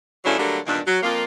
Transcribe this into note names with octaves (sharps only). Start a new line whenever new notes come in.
G2 C#3 F#3 A3 D4 E4
D3 F#3 G3 A3 A#3 D4
E2 G2 A#2 D#3 A#3 D4
F#3
F2 A#3 F4